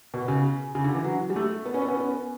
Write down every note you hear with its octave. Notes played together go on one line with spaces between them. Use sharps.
B2
C#3
C#3
D3
E3
F#3
G3
A3
B3
C#4
B3
C#4
B3